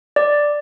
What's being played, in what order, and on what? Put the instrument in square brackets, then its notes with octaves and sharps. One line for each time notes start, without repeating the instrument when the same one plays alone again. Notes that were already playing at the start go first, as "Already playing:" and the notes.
[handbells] D5